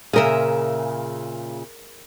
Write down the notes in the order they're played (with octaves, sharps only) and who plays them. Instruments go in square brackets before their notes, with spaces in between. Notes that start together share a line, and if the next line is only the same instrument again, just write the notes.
[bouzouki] A#2 C#3 E5 [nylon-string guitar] G#4 A#4